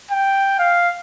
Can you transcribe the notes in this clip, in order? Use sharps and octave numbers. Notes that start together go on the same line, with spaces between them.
G5
F5